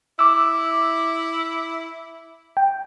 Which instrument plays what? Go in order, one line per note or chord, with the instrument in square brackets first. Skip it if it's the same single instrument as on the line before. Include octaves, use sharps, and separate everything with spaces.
[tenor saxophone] E4 [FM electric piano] D6 E6
[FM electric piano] G5